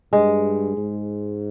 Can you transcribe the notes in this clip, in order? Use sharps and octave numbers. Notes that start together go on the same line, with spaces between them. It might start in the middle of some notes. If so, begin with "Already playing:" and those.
G2 G#3
G#2